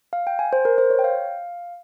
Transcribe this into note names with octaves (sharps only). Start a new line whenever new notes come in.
F5
G5
G#5
C5
A#4
C5
C#5
G5
F5